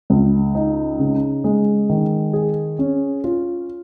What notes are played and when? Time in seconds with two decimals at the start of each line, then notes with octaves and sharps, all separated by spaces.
0.10 C#2
0.55 D#4
0.99 C#3
1.44 G#3
1.89 D#3
2.33 G#4
2.79 C#4
3.24 F4